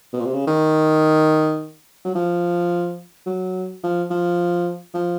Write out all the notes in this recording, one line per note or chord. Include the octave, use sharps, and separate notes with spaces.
B2
A#2
C3
C#3
D#3
F#3
F3
F#3
F3
F3
F3